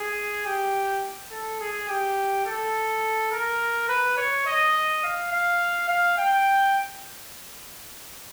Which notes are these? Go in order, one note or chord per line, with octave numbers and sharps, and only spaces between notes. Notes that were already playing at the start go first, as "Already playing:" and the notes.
Already playing: G#4
G4
A4
G#4
G4
A4
A#4
B4
C#5
D#5
F5
F5
F5
G5